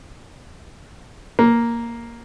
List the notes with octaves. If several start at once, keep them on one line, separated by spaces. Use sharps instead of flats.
A#3